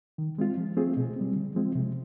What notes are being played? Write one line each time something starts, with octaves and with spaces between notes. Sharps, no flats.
D#3
G#3 C4 F4
F3
A3 C4 F4 G#4
B2
G3 C4
D3
F3 G#3 C4 F4
C3